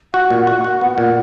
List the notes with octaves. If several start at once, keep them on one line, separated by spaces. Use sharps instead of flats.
F#4 F#5
A#2
F#4
F#4
B3
A#2